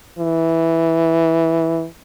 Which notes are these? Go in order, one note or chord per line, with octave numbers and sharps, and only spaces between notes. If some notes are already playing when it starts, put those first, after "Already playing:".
E3